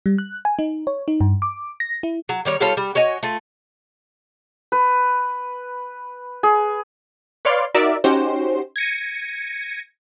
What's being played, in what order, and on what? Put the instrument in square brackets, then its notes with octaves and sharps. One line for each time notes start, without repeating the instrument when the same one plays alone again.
[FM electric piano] G3
F#6
G#5
D#4
C#5
D#4
G2
D6
A#6
E4
[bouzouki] F#3
D#3 G3 C#5
G3 F4 A4 C#5
G3
F#4 C#5 D#5 G#5
A3 F4
[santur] B4
G#4
[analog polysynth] B4 C#5 D5 F5 C6
D#4 F#4 A#4 D5 E5
C#4 D#4 F#4 G4 C5
G#6 A#6 C#7 D#7